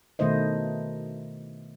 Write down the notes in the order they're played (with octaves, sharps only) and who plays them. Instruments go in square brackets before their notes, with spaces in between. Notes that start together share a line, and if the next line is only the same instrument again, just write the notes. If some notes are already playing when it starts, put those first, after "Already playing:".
[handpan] B2 D#3 A3 E4 C5 D#5